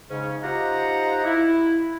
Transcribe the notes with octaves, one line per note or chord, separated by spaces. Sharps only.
G#2 C#3 C#4
D#4 F4 G4 C5 F#5 A#5
E4